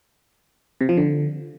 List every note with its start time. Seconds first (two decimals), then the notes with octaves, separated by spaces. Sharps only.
0.81 C3
0.89 F3
0.97 D3